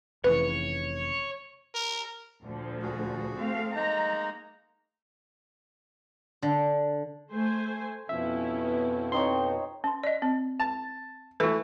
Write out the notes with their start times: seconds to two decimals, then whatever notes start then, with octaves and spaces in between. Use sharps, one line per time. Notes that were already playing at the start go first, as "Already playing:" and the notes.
0.24 F1 C#3 E3 B4 C#5
1.74 A#4
2.43 D2 A#2 F3
2.82 F#4 G#4
3.37 A3 C4 F5
3.75 G#3 A#3 D#4 A#5
6.42 D3
7.31 A3 C5 G#5
8.09 F2 B2 F3 B3 C#4 E4 E5
9.12 C4 D#4 C#5 C6
9.84 C#4 C6
10.04 D5 D#5
10.22 C4
10.60 A5
11.40 E3 A3 F#4 B4